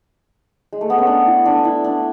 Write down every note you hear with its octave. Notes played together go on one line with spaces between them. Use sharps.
G#3
A3
B3
C#4
D4
E4
D4
E4
D4